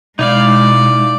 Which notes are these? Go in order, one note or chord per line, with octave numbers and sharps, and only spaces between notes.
B2 G#3 D#4 E4 D5 F5